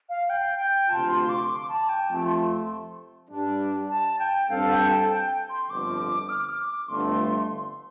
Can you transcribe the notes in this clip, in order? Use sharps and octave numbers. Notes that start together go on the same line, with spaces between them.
F5
G5
G5
D2 C3 F3 C4 F4 A5
C6
D6
C6
D6
A5
G5
F2 C3 F3 A3 A5
C6
C6
G2 G3 D4
A5
G5
G2 G3 C4 A4 F5
G5
A5
G5
C6
G1 F2 D3 F3 D6
F6
D6
F6
D6
G1 F2 D3 A3 C6